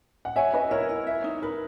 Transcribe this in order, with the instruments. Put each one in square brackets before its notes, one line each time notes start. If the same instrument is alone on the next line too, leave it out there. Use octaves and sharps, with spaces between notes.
[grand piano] F#5
[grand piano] C#5 E5 [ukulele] G#5
[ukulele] F#4 [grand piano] B4 D#5
[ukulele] E4 [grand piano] A#4 C#5
[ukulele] E4
E5
D#4
[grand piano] A#4 [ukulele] B4